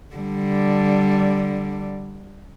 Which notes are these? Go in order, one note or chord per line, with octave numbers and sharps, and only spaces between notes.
D3 G3